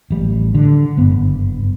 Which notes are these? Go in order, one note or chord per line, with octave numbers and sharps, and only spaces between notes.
A1 G3
D3
F#1 G2 B3